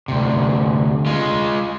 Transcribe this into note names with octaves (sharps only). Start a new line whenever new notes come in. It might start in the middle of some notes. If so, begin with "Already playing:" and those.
D2 C3
G#3 F4